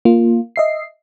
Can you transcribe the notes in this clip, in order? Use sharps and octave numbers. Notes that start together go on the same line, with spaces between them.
A#3 F4
D#5 E5 C7